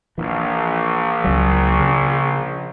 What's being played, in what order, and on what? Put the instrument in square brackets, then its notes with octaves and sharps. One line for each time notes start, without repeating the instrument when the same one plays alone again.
[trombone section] A#1 [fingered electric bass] E3
[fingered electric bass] C#2 F#3
C#3